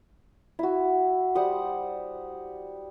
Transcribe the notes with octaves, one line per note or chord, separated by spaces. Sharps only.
E4 F#4
G3 C5 F#5 D#6